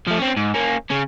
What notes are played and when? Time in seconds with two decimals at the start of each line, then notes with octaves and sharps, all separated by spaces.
0.08 F3 A3
0.19 C4 C#4
0.37 G#2
0.54 A#3 C#4
0.90 C#3 C#4